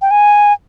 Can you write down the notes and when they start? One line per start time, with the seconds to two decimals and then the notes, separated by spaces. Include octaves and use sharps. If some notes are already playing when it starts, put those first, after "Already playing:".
0.01 G5
0.11 G#5